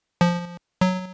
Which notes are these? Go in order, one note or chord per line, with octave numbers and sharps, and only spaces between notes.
F3
F#3